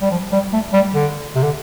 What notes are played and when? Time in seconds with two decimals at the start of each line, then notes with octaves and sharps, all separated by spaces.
0.02 G3
0.11 F3
0.32 G3
0.53 A3
0.73 G3
0.94 D3
1.35 C3
1.43 D3